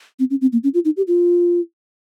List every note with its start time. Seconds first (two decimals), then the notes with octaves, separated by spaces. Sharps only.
0.19 C4
0.30 C#4
0.41 C4
0.53 A#3
0.64 C#4
0.74 F4
0.85 D#4
0.97 G4
1.08 F4